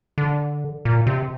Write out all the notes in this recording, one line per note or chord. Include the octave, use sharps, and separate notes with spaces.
D3
A#2
C3